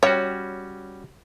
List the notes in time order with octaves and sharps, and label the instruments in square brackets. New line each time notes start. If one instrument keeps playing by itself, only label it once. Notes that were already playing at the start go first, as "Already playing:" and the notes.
[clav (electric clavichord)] G3 C#4 F#4 [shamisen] C#5 G5